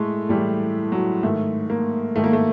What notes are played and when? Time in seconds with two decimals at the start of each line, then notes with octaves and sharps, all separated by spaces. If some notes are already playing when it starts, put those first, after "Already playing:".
Already playing: A2 G#3 A3
0.29 A2 E3 G3
0.92 F#3
1.23 G#2 D#3 A3
1.70 A#3
2.16 G#2 D#3 A3
2.24 A#3
2.33 A3